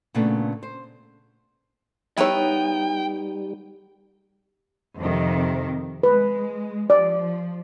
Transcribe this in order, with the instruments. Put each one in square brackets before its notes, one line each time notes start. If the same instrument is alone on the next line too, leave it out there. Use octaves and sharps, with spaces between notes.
[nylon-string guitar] A#2 C#3 A3 B3 D4
C5
[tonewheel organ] G3 [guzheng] B3 D#4 F#5 [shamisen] E4 C#5 [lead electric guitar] G5
[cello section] F2 C3 D#3
[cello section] G#3 [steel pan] B4
[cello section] F3 [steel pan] D5